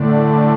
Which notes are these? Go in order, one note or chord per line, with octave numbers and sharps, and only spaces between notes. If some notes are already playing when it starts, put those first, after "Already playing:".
Already playing: A2 D3 A3 D4